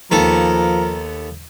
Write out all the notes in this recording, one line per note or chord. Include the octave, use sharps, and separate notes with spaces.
D#2 F3 B3 A4 A#4